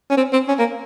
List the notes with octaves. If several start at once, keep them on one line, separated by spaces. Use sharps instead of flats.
C#4
C4
C4
C#4
A#3